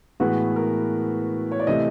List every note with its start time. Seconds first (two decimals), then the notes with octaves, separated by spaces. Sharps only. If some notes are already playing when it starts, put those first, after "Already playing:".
0.20 A2 E3 G#3 B3 F#4
0.56 A#4
1.52 C#5
1.60 D5
1.67 C3 E3 A3 D#5